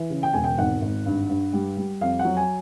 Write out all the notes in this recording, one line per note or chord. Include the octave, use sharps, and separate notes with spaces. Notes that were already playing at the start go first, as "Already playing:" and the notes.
Already playing: E3
C#3
G5
E1 G#5
G5
G#1 F#5
G#1
G2
G2
G3
G3
F2 F5
F#5
F#3
G#5